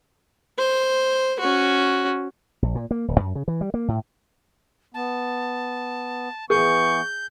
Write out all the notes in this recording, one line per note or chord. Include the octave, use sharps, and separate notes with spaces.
C5
C#4 F#4
A#1
A#2
A#3
D#1
F#2
C#3
E3
G3
A#3
A2
B3 A5
E3 B3 G#4 C#6 G6